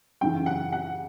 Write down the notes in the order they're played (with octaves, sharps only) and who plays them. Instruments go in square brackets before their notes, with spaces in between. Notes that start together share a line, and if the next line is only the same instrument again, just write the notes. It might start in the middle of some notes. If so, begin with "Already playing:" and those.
[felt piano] F#2 C#3 E3 [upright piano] G5
[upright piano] F#5
F#5